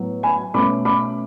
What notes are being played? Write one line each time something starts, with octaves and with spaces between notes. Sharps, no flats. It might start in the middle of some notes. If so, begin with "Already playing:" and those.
Already playing: A2 F#3 B3
G#5 B5
B2 A3 C#4 B5 D6
B5 D6